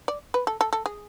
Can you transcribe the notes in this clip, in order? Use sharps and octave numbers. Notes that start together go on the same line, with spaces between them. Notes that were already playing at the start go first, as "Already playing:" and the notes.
D5
B4
A4
A4
A4
G#4